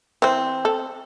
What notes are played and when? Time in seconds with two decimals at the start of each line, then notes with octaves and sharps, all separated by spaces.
0.22 E3 C4 C5
0.65 A4